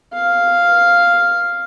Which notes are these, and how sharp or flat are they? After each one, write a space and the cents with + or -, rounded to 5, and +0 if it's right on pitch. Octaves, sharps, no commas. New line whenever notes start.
F5 +0